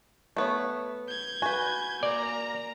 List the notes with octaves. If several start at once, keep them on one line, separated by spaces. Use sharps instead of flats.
A3 B3 C#5
G6 G#6
F#4 B4 G#5
A#3 D5 A#5